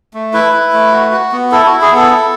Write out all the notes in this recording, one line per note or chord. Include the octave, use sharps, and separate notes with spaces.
A3
E4 B4
E4
A3
F#4
F#4
B3
E4 A4
F#4
E4
G#4
B3 A4
E4